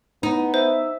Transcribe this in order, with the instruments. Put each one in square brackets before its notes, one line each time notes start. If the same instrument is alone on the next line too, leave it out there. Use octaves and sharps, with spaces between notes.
[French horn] B3 [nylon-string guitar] D#4
[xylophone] C5 [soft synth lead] E5